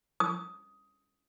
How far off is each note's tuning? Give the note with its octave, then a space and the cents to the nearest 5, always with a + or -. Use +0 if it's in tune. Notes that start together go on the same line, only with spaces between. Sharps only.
D#6 +10